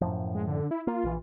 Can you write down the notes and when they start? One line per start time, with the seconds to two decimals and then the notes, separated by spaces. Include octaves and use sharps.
0.01 F#2 A2 F3
0.34 G#3
0.48 D3
0.71 E4
0.87 A#3 F4
1.04 A#1 E3